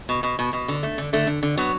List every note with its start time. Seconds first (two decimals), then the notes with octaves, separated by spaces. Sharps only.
0.09 B2
0.23 B2
0.39 B2
0.53 B2
0.68 D3
0.83 A3
0.98 D3
1.13 D3 A3
1.27 D3
1.43 D3
1.57 F#3 B3